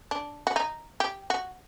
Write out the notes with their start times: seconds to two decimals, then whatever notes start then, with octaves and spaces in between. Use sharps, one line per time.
0.11 D4
0.47 F#4
0.56 D#4
1.00 G4
1.30 F#4